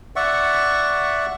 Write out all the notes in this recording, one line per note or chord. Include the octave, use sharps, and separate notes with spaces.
D5 E5 F#5 C#6